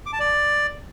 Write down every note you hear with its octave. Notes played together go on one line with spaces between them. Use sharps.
D6
A5
D5